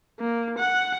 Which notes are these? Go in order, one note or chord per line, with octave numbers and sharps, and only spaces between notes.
A#3
F#5